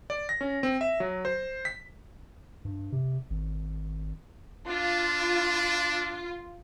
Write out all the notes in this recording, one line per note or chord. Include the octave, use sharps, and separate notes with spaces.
D5
A#6
C#4
C4
E5
F#3
C5
B6
G2
C3
G#1
D4 F4